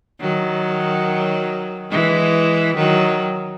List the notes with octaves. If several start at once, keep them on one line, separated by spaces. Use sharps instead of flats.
D#3 F#3
E3 G#3
D#3 F#3